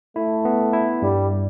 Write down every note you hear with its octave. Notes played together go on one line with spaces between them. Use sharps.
A3 E4
B3
E4
G2 G3